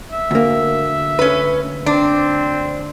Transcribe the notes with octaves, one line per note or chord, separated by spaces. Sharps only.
E5
D2 A#3
C#4 B4
C4 D4